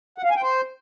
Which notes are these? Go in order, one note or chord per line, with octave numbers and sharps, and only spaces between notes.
F#5
F5
G#5
G5
C5